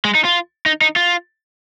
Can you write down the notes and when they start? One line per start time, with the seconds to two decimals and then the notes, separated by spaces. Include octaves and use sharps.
0.05 G#3
0.15 D#4
0.25 F4
0.66 D#4
0.81 D#4
0.96 F4